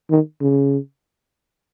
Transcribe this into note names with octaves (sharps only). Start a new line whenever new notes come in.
D#3
C#3